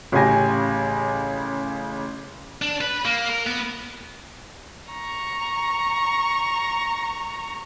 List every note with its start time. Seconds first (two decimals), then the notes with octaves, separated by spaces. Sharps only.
0.12 A1 C#3 G4 G#5 A#6
2.62 D4
2.81 B4
3.05 A#3
3.30 A#4
3.47 B3
4.92 A#5 C#6